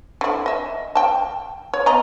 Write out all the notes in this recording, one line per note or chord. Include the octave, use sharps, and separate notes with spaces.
D3 E4
D#5 E5
G5 A5
C#5
B3 D#5 A#5